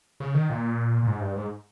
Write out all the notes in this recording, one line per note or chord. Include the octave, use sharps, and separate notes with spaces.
C#3
D#3
A#2
A#2
G#2
G2
G#2